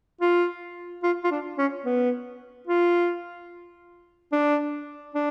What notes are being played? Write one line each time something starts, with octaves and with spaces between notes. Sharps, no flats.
F4
F4
F4
D4
C#4
B3
F4
D4
D4